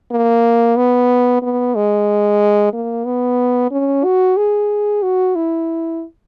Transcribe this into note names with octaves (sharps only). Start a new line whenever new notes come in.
A#3
B3
B3
G#3
A#3
B3
C#4
F#4
G#4
F#4
E4